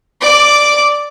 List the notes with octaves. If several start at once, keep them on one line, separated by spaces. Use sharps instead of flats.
D5 D6